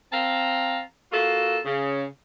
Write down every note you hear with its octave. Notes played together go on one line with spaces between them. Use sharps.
C4 F5 A5 A#5
A#3 F4 F#4 A4
C#3